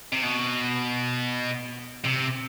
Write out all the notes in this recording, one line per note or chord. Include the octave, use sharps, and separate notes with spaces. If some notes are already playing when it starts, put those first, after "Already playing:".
C3
B2
C3